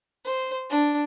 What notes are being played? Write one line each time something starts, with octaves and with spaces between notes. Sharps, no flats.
C5
D4